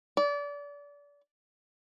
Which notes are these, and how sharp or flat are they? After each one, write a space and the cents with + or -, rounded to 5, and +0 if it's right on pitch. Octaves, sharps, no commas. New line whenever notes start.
D5 -30